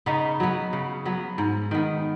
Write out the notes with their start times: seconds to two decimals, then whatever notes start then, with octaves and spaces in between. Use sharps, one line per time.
0.06 C#3 B3 D#4
0.40 F#3 B3
0.73 C#3
1.05 F#3 B3
1.38 G#2
1.71 D#3 B3